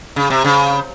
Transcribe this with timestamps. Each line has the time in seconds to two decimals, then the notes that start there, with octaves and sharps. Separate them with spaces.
0.16 C#3
0.30 C3
0.45 C#3